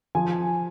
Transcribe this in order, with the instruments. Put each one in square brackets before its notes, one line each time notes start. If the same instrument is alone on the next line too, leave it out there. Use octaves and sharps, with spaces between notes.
[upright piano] F3 [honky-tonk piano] G#5